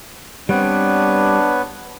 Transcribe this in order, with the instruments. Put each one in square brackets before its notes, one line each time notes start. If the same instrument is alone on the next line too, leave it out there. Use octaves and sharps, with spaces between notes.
[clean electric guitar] G3 C4 [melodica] B3 B4 C#5 [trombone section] D4